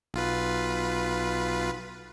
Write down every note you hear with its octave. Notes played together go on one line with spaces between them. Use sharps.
B1 F4 B4